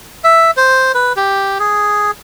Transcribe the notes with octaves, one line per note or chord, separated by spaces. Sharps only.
E5
C5
B4
G4
G#4